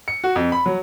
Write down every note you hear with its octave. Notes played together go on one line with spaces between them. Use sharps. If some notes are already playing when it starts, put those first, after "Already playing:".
C#7
F#4
F2
B5
F#3